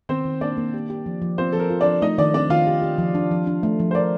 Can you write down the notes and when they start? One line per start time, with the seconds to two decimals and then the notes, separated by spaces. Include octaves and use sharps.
0.09 D#3 C4 C5
0.25 D#3
0.41 A#3 D4 D5
0.57 A#3
0.74 G4
0.90 G4
1.06 F3
1.22 F3
1.38 C4 F4 C5
1.53 F3 A4
1.60 A#4
1.70 F4
1.81 D4 D5
1.86 F3
2.02 A3 D#4 D#5
2.18 D#3 D4 D5
2.34 C4 D4 D5
2.50 D#3 F4 F5
2.67 G4
2.82 G4
2.98 F3
3.15 D4
3.31 F3
3.47 D4
3.63 A3
3.80 F3
3.91 C5
3.95 D4 A#4 D5